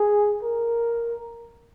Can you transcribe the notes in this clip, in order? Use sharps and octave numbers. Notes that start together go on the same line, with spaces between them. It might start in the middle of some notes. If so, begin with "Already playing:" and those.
Already playing: G#4
A#4